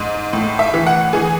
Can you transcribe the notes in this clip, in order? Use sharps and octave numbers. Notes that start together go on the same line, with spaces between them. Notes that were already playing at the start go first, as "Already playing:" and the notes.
Already playing: G#2
A2
E5
E3
F#5
E3 G#4